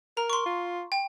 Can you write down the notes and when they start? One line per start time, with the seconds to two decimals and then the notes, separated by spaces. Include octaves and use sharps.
0.17 A#4 A#5
0.30 C6 C#6
0.46 F4
0.92 G5